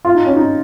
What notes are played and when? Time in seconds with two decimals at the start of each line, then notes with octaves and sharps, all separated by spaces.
0.05 F4
0.15 D#4
0.26 C#4
0.36 D#4